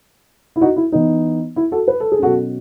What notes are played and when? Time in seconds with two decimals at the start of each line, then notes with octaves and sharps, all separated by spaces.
0.56 E4
0.61 D#4 F#4
0.76 E4
0.92 E3 B3 D#4
1.56 E4
1.72 F#4 A4
1.88 B4
2.00 A4
2.12 G#4
2.19 B2 F#3 C#4 F#4 A4